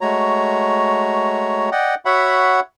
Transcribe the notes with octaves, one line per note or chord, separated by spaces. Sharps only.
G#3 A3 F#4 C#5 A#5
D5 D#5 F#5 G5
F#4 C#5 E5 F#5 B5